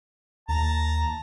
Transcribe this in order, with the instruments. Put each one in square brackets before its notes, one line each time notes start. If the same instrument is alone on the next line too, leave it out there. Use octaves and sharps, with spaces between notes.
[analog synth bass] D#2 [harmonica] A5 A#5